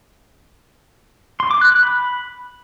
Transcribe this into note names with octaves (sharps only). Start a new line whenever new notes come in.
C6
D6
F#6
F#6
B5